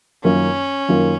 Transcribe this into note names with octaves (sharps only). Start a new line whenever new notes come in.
F#2 D#3 A#3 C#4 F4
F#2 D#3 A#3 F4